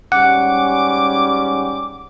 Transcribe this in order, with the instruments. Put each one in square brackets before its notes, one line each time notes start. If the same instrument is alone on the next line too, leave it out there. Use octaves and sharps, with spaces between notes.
[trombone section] G#2 G3 C#4 [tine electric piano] F#5 [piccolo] D6